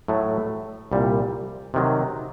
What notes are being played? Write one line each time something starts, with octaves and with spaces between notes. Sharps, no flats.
A2 F#3 A3
C2 A#2 G3
C3 D#3 F#3